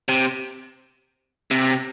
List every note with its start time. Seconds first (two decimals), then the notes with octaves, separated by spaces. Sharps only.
0.09 C3
1.51 C3